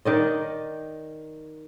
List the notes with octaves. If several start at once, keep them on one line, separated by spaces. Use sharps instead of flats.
D#3 D5 D#5